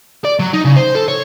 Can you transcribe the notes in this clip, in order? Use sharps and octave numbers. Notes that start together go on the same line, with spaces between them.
D5
F#3
D#4
C#3
C5
A4
C#5